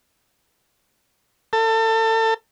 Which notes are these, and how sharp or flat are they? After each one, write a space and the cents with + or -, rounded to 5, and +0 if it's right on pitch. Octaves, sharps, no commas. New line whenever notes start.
A4 +30